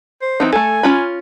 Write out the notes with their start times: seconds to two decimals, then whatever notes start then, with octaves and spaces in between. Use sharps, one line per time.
0.22 C5
0.40 E3 C4 D#4
0.53 A3 A4 G#5
0.83 C#4 F4 B5